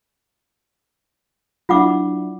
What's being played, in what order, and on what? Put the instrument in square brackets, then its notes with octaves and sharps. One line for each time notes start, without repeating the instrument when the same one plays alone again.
[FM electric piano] F#3 D4 E4 [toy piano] F4 F#5 D6